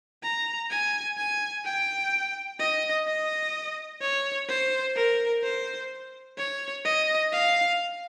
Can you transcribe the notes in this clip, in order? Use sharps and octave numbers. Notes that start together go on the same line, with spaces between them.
A#5
G#5
G#5
G5
D#5
D#5
C#5
C5
A#4
C5
C#5
D#5
F5